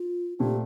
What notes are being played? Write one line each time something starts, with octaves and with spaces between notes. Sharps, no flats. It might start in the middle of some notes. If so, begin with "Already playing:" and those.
Already playing: F4
A#2 A3 C4 G4